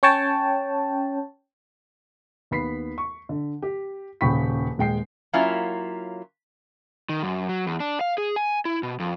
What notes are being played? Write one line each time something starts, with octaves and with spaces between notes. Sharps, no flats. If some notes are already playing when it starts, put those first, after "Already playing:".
C#4 C#5 G5 A5
D#2 B3 B5 B6 C7
C#6
D3
G4
D#1 C#3 G5 B5 C#6 B6
D#1 G#3 G5 C7
F#3 A#3 C#4 E4 F4
D#3
F#2
F#3
E2
D4
F5
G#4
G#5
E4
B2
F2